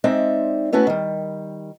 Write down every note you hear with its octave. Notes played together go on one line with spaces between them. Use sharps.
G#3 C4 D#4 D5 E5
A3 B3 C#4 E4 F#4
D#3 G3